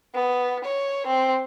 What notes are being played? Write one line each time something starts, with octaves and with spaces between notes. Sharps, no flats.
B3
C#5
C4